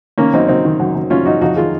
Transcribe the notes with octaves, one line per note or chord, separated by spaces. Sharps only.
D#3 A#3 C#4
F#2 C4 D#4
F#2 C4 D#4
D#3
F#2
F#2
F#2 C#4 F4
F#3 D#4 F#4
F2 D#4 F#4
D#3 F4 G#4